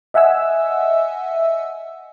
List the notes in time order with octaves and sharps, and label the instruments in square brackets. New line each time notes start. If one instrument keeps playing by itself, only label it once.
[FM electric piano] D#5 E5 F#5 G#5 E6